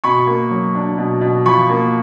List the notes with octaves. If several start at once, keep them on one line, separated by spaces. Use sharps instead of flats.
B2 B5 C#6
A#3
F#3
D4
B2
B2
F3 B5 C#6
A#3